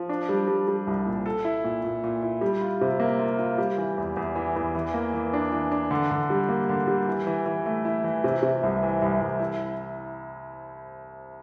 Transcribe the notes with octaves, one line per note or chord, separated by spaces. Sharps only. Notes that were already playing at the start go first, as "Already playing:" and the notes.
Already playing: F3
D4
G3
G3
G3
C2
A#2
A4
E4
A#2
A#2
A#2
E4
G3
F4
C3
A#3
F4
F4
G3
E3
E2
E2
E3
E2
E3
A#3
E3
D4
E3
D4
D3
D3
G3
A#3
D3
G3
E3
E3
E3
A3
E4
E3
C3
C3
C2
E3
C2
C2
E4